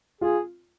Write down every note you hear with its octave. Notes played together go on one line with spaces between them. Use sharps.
F4 G#4